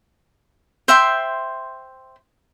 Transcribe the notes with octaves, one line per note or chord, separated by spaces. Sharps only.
C5 E5 G5 C6